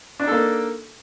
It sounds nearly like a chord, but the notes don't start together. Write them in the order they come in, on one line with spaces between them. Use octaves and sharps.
D4 D#4 A4 A#3